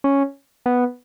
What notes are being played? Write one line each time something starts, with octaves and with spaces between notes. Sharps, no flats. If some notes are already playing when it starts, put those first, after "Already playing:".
C#4
B3